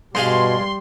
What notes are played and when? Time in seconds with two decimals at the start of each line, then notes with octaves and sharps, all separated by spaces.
0.15 G2 B2 G3 G#4 F5 C6